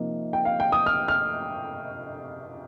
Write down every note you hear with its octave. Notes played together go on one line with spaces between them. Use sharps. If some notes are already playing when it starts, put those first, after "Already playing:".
Already playing: C3 F3 A#3 D#4
G5
F5
G5
D#6
F6
F6